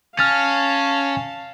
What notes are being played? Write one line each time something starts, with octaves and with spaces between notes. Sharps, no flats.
C#4 F5 A5 F6 A6